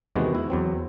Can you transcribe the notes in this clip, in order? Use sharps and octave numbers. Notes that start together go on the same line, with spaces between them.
E2 C3 D#3 G#3 B3 F#4
E4
E2 F#3 C4